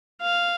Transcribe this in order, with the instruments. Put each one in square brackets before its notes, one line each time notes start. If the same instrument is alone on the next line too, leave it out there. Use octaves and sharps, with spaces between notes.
[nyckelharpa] F5